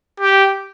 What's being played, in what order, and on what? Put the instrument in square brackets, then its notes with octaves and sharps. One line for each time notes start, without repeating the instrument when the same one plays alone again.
[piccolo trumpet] G4